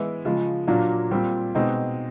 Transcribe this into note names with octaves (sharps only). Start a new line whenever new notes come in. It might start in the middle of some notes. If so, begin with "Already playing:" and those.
Already playing: E3 G#3 B3 E4
C#3 F3 G#3
A#2 F#3 A#3 D4
A#2 G3 C4
B2 G#3 C4 D#4